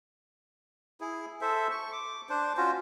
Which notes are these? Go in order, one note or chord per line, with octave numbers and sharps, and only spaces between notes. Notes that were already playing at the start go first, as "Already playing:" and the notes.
E4 G#4
A4 C5 E5
C#6
D6
D4 C5
C#4 F4 F#4 C5